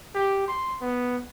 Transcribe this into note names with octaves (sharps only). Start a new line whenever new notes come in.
G4
C6
B3